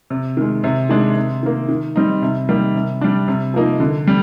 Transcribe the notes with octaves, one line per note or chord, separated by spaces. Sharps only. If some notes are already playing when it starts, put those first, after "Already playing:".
C3
D#3 G#3
C3
D#3 G#3 D4
C3
D#3 A#3
D#3
G3 C4 D#4
C3
D#3 G3 A#3 D#4
C3
G3 D4
C3
F3 A#3 D#4
D3
G3